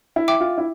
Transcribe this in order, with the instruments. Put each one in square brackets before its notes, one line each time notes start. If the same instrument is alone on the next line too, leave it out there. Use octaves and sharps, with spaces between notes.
[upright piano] E4
[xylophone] E5 G5 D6
[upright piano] F4
E4